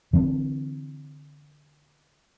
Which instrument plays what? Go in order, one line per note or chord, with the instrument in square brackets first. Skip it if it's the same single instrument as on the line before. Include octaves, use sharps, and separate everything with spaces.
[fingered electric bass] D3 E3 C4